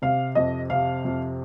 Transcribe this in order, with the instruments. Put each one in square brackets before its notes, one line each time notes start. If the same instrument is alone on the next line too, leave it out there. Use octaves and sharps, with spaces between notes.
[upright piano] C3 F5
F2 D#5
C3 F5
F2